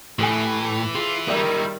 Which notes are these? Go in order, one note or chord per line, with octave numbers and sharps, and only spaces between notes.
A2 E3 G4 A4 G#5
F4 G#4
D#3 G3 D#4 E4 G4 D5 E5